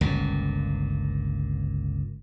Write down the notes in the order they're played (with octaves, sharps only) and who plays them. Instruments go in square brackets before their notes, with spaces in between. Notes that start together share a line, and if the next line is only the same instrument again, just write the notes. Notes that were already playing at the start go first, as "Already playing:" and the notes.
[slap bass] G1 C#2 A#2